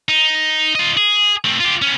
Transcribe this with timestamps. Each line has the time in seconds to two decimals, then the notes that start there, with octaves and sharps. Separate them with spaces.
0.09 D#4
0.75 F4 D#5
0.97 G#4
1.45 A3 C4
1.60 F4 G4
1.82 B3 C#4